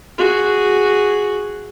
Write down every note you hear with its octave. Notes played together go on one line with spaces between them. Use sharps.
F#4 G#4